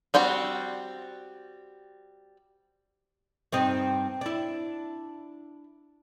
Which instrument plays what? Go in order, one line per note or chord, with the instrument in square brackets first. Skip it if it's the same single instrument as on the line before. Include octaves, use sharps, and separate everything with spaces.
[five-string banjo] G3 C4 F#4 F#5
[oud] G2 C4 D#4
D4 E4